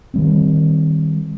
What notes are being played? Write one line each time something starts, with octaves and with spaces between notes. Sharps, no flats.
D#3 G3 C4